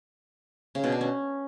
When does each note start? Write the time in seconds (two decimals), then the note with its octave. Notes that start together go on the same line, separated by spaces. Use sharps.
0.75 C#3
0.84 B2
0.92 D4
1.01 C#4